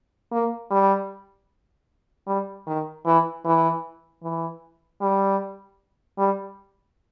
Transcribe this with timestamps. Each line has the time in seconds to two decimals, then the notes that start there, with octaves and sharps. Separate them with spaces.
0.32 A#3
0.71 G3
2.27 G3
2.67 D#3
3.06 E3
3.45 E3
4.23 E3
5.01 G3
6.18 G3